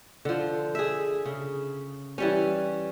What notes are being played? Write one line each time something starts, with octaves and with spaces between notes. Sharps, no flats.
D3 F3
G#4 E5
C#3
E3 G3 C#4